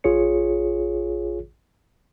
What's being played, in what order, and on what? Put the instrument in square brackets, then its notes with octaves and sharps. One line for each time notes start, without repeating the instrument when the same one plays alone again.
[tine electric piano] A1 F4 G#4 C#5 C#7